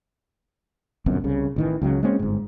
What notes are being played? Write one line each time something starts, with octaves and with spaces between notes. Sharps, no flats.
G1 C2 F#2 B2
C2 C#3
A1 D#3 E3
C#2 C#3 F#3
G#3 A#3 C4 C#4
G1 G#2